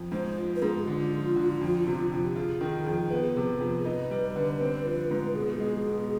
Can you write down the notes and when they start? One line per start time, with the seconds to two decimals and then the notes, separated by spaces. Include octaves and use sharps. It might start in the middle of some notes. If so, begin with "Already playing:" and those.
Already playing: F2
0.12 G#2 C5
0.37 F3
0.56 B4
0.62 G#2 G#4
0.83 G4
0.87 D3 F4
1.12 F3
1.36 D3
1.61 F2
1.87 C3
2.12 F2 F4
2.25 G4
2.36 F4 G#4
2.61 D#3
2.86 F2
3.10 B3
3.37 C3
3.61 F2
3.78 G#4
3.85 D#4 B4
4.11 G3
4.36 D3
4.61 C4
4.85 F3
5.11 G#2
5.35 B2 G#4
5.60 G#3
5.85 B2